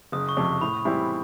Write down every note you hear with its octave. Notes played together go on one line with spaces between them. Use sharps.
F#1 D#6
C#6
F2 C3
C#6
A2 B5
E3 G3 C4 E4